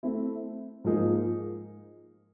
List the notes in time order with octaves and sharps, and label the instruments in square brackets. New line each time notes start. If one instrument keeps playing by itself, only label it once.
[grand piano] A3 C4 E4
G#2 F3 A#3 D#4 G#4